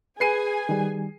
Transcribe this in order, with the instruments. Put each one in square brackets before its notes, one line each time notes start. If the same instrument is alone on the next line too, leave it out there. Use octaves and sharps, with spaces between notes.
[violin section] G#4 G#5 [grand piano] B4 C7 D#7
[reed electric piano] D#3 G3